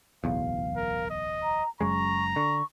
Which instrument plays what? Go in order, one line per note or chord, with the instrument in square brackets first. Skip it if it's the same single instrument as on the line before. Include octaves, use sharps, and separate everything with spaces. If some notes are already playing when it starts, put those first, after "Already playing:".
[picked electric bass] D1 B1 E2 [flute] F5
[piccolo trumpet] A#4
D#5
[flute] A#5
[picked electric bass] F#1 F#2 G#3 [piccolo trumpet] A#5 [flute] C#6
[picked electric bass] D3 [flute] C#6